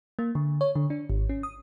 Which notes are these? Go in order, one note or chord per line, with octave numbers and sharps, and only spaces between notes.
A#3
D3
C#5
D3
D4
G#1
C#4
D#6